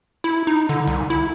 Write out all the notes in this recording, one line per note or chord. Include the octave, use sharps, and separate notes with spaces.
E4
D#4
D3
C2
E4